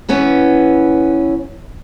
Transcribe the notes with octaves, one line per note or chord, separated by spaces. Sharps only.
E3 B3 C#4